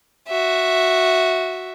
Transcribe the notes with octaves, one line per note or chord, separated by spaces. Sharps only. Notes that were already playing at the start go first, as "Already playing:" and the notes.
F#4 E5